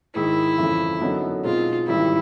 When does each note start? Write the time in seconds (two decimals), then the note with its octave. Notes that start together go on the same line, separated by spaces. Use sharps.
0.15 G#2 D#3 G#3 E4
0.58 G1 F2 C#3 E3
1.01 F#2 D3 F#3 B3 D#4
1.44 B2 G#3 C4 D#4 F4
1.87 A1 G#2 D#3 G3 E4